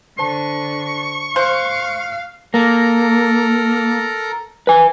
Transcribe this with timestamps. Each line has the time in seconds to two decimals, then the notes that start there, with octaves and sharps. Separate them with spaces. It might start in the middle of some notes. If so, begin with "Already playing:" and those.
0.19 D3 C5 A5 C#6
1.36 C5 F5 F#6
2.54 A#3 A4 A#4 A#5
4.67 B4 G#5